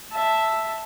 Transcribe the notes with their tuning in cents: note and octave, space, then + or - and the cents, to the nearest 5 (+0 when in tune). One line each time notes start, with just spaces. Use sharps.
E5 +0 A5 +0